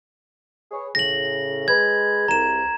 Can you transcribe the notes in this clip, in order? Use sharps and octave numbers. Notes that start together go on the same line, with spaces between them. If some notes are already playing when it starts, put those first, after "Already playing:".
G#4 B4 C#5
A2 C#3 A#6 F#7
G#3 B4 G#6
C2 A#5 E7